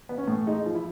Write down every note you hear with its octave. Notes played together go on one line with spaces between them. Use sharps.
B3
C#4
A2
G#3 D#4
F3
E4